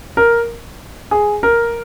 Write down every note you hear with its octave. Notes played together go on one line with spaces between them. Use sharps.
A#4
G#4
A#4